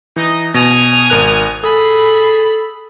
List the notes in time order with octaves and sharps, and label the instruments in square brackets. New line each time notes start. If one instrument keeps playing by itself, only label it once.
[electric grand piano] E3 [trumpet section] D#4 D#5
[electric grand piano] B2 A#6 [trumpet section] G#5 [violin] D#6 F7
[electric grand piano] G#1 A#4 F#6
[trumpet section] G#4 [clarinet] A4 [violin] B5 [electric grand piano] D#6